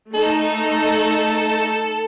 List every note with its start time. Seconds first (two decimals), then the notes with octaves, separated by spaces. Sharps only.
0.14 A3 D#4 A4